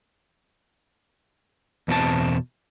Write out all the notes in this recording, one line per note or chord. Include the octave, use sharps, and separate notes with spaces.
E2 B2 C4 E4 A5